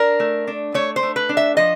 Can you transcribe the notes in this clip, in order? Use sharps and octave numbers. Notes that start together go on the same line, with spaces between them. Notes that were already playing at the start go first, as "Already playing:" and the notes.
Already playing: D4 A#4
A3
D4
A3 C#5
C5
A3
B4
D4
E5
F3 D#5